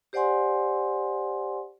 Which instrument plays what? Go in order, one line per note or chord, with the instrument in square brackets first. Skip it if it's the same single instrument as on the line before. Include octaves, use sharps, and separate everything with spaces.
[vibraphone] G4 C5 D5 F#5 G#5 C6